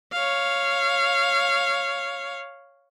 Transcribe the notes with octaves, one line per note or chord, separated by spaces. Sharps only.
C#5 F5